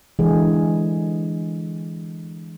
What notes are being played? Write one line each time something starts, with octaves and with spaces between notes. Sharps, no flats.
D3 E3 G#3 G#4